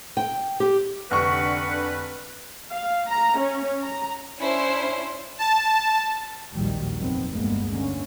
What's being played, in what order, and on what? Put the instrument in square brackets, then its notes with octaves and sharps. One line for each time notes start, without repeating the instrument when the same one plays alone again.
[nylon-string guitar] G5
G4
[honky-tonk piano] F1 C#6 [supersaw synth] D3 D4 [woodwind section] B4 [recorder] F#5
[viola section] F5
A#5
C#4
A#5
[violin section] C#4 D4 E4 C5
[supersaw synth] A5
[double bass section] A#1 D#2 D#3 F#3 G3
F1 A#2 D#3 F#3 B3 C4
G1 D2 G#3 A#3 B3
D3 A#3 C#4